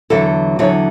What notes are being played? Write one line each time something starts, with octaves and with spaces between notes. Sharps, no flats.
E2 D3 F#3 A4
E2 D3 F#3 C#5